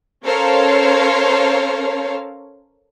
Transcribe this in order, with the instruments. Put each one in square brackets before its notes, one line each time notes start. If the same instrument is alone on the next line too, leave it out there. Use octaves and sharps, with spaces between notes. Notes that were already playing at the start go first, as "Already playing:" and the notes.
[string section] C#4 A4 A#4 C5 C#5 F5